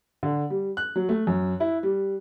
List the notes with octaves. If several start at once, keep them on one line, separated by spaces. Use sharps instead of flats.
D3
G3
F#6
F#3
A3
F#2
E4
G3